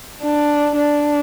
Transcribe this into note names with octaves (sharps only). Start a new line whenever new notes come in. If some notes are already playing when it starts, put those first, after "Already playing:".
D4
D4